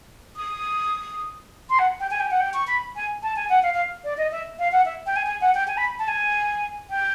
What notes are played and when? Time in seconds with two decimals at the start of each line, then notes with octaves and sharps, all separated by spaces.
0.36 D#6
1.70 C6
1.79 F#5
2.00 G5
2.11 G#5
2.20 G5
2.31 F#5
2.41 G5
2.54 C#6
2.67 B5
2.96 G#5
3.23 A5
3.36 G#5
3.49 F#5
3.63 F5
3.74 F5
4.04 D5
4.17 D#5
4.32 E5
4.59 F5
4.72 F#5
4.85 E5
5.06 G5
5.16 G#5
5.26 G#5
5.41 F#5
5.55 G5
5.68 G#5
5.77 B5
5.99 A5
6.08 G#5
6.90 G5